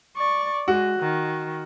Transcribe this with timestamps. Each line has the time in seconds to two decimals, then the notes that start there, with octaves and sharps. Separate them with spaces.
0.17 D5 C#6
0.68 G#3 F#4
1.00 D#3